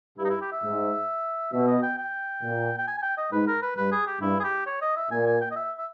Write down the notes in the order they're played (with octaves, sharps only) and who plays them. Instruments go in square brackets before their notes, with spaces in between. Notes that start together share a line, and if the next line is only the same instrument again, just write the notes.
[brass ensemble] G2 [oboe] E4
[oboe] D#4
E4
G4
E5
[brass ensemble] G#2
[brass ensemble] B2 [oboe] E5
[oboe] D#5
G5
G5
[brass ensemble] A#2
[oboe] G5
G#5
G#5
G5
D#5
[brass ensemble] G#2 [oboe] B4
[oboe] A#4
B4
[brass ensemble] G2 [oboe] B4
[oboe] G#4
G4
[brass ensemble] G2 [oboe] E4
[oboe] G#4
G4
C#5
D#5
E5
[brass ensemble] A#2 [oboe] G#5
[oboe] G#5
G5
D#5
E5
E5